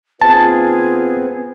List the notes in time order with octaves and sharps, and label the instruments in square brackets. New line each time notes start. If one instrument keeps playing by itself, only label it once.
[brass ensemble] D#2 F4 [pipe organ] B3 C4 [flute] G#4 [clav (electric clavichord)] A5